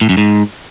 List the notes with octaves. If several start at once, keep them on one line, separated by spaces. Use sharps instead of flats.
A2
F#2
G#2